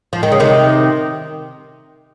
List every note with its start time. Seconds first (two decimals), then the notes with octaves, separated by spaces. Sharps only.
0.13 F3
0.23 D#3
0.32 C#3
0.40 C3 D#3